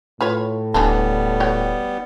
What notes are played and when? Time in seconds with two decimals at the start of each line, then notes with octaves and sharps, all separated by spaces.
0.21 A2 F4 B4 C#5
0.74 D1 E3 G3 B3 D4 A4
1.40 F#4 C#5 G5